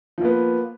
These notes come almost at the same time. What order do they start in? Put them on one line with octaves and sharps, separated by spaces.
F3 A#3 B3